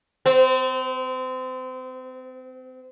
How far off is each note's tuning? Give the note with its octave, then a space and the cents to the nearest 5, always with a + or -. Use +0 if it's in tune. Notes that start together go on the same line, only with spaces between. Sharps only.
C4 -30